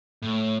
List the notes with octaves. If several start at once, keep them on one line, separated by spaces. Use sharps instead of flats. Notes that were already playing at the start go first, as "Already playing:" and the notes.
A2